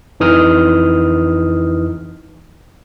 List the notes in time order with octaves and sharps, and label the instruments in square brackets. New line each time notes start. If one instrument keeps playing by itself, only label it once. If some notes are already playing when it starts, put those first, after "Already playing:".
[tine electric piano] F2 E3 D#4 D#6 F6